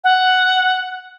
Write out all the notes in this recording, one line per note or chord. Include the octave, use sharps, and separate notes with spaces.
F#5